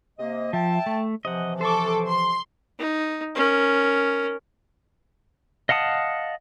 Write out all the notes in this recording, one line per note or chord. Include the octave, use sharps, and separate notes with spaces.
C3 A#3 D#5
F3 E5 G5 A5
A3
C3 E3 F3 D#5 F#5
A4 C5 C#6 D6
C6
D#4
C#4 A#4
D#5 F5 F#5 A5 D#6